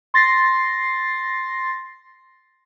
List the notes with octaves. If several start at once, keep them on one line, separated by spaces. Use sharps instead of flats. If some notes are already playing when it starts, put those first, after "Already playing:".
C6 A6 A#6 C7